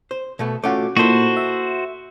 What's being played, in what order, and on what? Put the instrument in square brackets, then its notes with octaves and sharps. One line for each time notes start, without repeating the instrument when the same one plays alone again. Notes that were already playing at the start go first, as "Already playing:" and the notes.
[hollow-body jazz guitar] C5
B2 A3 B3
[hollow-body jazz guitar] A3 C#4 F4 [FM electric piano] F#4 D6
[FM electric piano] A#2 [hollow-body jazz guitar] E4 A4 D#5 [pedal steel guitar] F#4 C5
[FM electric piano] E5